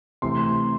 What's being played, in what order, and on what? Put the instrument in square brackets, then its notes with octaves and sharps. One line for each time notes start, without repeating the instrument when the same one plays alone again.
[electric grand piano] C3 E3 A3 [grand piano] C6